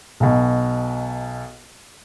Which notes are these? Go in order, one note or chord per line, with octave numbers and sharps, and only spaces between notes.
B1 B2